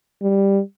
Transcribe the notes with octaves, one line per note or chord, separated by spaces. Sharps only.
G3